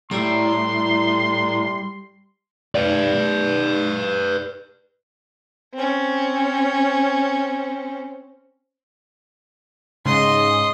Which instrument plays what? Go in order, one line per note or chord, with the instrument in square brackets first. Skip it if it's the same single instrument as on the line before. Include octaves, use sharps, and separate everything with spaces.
[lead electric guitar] A2 [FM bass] G3 [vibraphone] E4 D5 A#5 [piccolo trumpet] C6
[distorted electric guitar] B4 D5
[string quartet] C4 C#4
[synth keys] G#2 C#3 [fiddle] D#5 C6